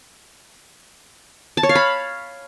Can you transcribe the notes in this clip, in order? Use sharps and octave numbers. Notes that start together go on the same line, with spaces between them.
A5
C#5
F5
B5